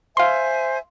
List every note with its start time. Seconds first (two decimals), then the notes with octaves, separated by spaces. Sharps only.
0.17 C5 E5 F5 G#5 C6